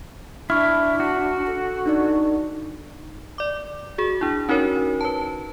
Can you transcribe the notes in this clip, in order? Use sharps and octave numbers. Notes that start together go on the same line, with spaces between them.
D4 E4 C#6 F6
F#4
A4
D4 D#4 D5
D5 D6
F#4 G#4
D4 E4
C#4 D#4 F#4 A#4 C#5
B4 A5